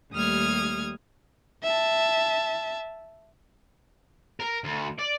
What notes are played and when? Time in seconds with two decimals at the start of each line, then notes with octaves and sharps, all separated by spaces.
0.13 D#2 G3 A3 D#6 F6 G#6
1.64 E5 A5
4.40 A#4
4.64 D2
4.98 D5